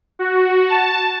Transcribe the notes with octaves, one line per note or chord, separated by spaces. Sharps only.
F#4
A5